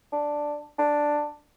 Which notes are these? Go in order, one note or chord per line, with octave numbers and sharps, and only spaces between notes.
D4
D4